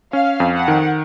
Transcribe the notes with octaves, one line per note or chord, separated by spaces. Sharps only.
C#4 F5
F2
F#5
D#3